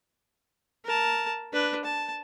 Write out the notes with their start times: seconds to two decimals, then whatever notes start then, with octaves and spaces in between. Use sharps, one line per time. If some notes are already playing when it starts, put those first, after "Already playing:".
0.85 A#4 A5
1.53 D4 B4
1.85 A5